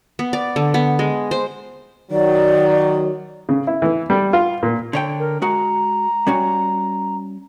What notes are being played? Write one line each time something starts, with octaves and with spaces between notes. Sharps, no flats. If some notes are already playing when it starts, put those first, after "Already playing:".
B3
D5
D3
B3
G#3
C5
D#3 F#3 D5
C#3
E4
E3
G3
F4
A#2
D3 C#5 G5
A#4
G#3 F#4 A#5
G3 C#4 F#4